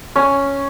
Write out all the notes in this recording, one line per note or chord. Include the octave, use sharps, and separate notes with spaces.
C#4